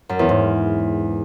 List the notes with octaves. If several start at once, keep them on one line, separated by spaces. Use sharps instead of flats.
F#2
E2
G#2